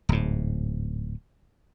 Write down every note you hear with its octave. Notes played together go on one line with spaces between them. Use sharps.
D1 G#2